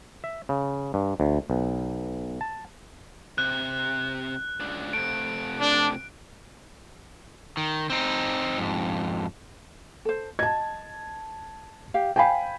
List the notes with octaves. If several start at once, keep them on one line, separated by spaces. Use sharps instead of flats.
E5
C#3
G2
D2
B1
A5
C3 F#6
C#2 D4
C3 A3 D7
D4
D#3
C4 D#4
F2 G#2
A4 C5
D#5 A5 G#6
G4 F5
C5 F5 G5 G#5 B5